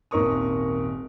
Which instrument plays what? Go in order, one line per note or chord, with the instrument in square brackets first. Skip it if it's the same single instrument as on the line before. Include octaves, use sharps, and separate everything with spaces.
[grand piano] D#1 G#1 D#4 A#4 C#6 D#6